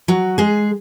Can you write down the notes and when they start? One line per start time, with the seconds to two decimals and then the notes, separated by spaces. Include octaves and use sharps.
0.08 F#3 F#4
0.38 G#3 G#4